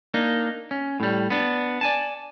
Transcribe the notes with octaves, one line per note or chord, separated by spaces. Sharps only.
A#3 D4 D#4
C#4
A2 G3
B3 D4
D5 G#5 A5